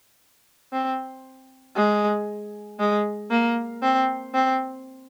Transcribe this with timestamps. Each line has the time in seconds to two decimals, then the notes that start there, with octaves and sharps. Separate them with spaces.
0.73 C4
1.77 G#3
2.80 G#3
3.31 A#3
3.83 C4
4.34 C4